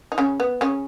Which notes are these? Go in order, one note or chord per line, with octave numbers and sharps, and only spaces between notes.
D#4
C#3 C#4
B3
C#3 C#4